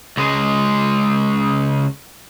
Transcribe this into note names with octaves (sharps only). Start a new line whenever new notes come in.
C#2 G#3